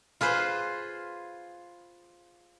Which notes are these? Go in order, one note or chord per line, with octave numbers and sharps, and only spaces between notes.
F4 G#4 B4 C5